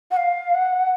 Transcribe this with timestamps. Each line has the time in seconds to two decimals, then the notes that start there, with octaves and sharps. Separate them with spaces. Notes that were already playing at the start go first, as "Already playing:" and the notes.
0.11 F#5
0.17 F5
0.54 F#5